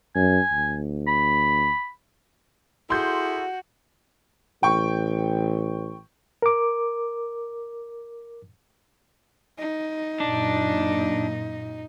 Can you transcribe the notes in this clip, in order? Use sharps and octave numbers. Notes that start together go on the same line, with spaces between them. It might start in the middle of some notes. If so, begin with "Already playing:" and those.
F#2 G#5
D2
B5
E4 F#4 G#4 A4 C6 G6
A1 G5 C#6
A#4 D6
D#4
F#2 A#2 D4